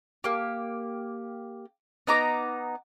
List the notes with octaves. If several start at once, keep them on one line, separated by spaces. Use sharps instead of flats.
A#3 G4
B3 D#4 A#5 D6